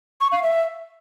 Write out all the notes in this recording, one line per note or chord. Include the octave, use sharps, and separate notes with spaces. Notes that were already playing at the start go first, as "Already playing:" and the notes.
C#6
F5
E5